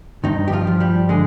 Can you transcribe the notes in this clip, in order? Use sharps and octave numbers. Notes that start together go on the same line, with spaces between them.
G2 D#3 D#4
G4
F3 F4
F3
G3 G4
D3 G#3 G#4